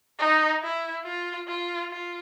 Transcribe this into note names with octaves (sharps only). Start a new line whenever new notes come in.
D#4
E4
F4
F4
F4